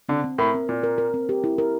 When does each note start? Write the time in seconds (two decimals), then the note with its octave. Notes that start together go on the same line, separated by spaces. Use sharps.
0.09 D3 C4
0.24 C4
0.38 A2 A#4
0.54 C4
0.69 A#2 C4
0.83 A#4
0.98 A#4
1.14 C4
1.29 G4
1.44 E4
1.58 A#4